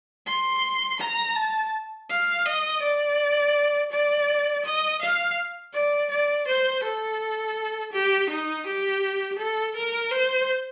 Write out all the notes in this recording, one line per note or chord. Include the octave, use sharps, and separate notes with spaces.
C6
A#5
A5
F5
D#5
D5
D5
D#5
F5
D5
D5
C5
A4
G4
D#4
G4
A4
A#4
C5